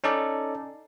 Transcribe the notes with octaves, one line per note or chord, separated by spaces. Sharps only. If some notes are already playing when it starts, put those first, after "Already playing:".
C#4 D#4 A4 D5